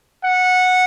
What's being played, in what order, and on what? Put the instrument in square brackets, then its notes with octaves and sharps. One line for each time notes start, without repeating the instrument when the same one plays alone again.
[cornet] F#5